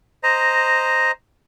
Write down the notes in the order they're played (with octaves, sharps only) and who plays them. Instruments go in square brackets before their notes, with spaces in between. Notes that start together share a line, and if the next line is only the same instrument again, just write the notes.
[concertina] C5 D#5 A#5